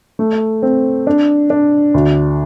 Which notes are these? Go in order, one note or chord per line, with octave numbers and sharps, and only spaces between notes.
A3
C4
D4
D4
D2